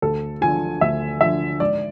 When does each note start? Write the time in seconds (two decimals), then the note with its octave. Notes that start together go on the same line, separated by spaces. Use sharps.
0.02 D2 A4
0.41 D3 F3 G#5
0.81 D2 E5
1.21 D3 F3 E5
1.60 G#2 D5